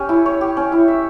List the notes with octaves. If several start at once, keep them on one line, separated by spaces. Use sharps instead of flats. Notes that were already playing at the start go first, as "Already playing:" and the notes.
Already playing: C#4 G4 C#5
E4
C#5
G4
C#4
E4
E5